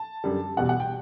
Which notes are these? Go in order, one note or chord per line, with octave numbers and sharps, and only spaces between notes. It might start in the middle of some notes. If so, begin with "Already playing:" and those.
Already playing: A5
F#2 D3 G3
E2 B2 G3 F#5
F#5
G5